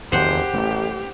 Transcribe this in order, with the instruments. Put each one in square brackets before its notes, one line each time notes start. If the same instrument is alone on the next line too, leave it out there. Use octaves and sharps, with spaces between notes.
[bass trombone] F#1 [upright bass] E2 D#3 [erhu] G4 [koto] C5 F#5
[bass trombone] A1 [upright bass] A3